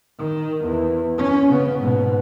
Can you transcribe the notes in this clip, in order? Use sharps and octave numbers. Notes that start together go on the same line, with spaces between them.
D#3
E2
C#4
C#3 B3
G#2 B2